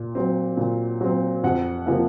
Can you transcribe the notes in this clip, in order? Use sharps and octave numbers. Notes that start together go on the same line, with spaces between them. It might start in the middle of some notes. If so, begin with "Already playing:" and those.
Already playing: A#2
F#3 C4
A#2
F#3 C4
F2 F#5
C3 F3 A#3